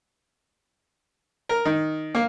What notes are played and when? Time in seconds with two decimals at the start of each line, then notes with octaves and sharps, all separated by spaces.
1.49 A#4
1.65 D#3
2.15 A#3